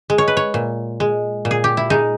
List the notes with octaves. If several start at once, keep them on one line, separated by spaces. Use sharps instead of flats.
G#3
C#5
B4
C#5
A#2
G#3
A#2
G#4
G4
E4
G#3 D#4